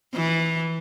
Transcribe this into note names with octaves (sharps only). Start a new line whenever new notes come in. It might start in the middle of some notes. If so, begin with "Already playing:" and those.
E3